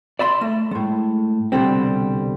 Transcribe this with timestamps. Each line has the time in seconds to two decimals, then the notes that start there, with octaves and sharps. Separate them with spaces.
0.19 D5 E5 B5 C6
0.41 A3
0.71 A2 G#3
1.52 C2 B2 D3 G3 C4